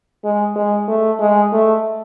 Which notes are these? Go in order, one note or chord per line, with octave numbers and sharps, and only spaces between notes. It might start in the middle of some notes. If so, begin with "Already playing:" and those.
G#3
G#3
A3
G#3
A3